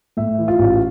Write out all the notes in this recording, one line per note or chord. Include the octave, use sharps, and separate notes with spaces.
A2 E5
E3
F4
A1